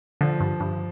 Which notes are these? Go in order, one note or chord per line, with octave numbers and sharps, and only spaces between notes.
D3 F3
G2
G2